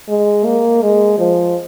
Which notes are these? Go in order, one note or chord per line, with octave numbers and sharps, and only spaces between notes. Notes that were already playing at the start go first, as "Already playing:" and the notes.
G#3
A#3
G#3
F3